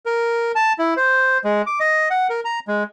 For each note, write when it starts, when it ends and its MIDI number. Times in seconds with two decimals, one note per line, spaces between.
0.06 0.52 70
0.55 0.73 81
0.79 0.94 64
0.97 1.38 72
1.44 1.62 56
1.66 1.79 86
1.80 2.09 75
2.10 2.27 78
2.30 2.40 70
2.45 2.59 82
2.68 2.83 56